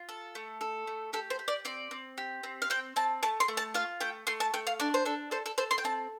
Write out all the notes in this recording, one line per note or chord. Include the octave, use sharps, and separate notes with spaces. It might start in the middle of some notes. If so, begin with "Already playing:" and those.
Already playing: F4
A4
A3
A4
A3
G4 A4
C5
G4
D5
C4 D5
C4
G4
C4
F5
C4 G5
C4 A5
A3 A5
C6
A3
A5
F4 F5
A3 G5
A3 C6
A5
A3 G5
F5
D4 D5
C5
D4 A4
A4 C5
A4
A4 C5
C6
G5
C4 A5